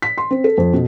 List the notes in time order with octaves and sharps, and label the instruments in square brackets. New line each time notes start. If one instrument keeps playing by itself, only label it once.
[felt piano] B6
C6
C4
A4
F2
B2